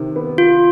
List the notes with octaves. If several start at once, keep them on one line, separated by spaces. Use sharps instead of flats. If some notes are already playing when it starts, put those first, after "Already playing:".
Already playing: C3 D#3
B3
F4